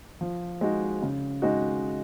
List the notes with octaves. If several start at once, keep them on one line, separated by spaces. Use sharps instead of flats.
F3
G#3 D#4 F#4
C#3
G#3 D#4 F#4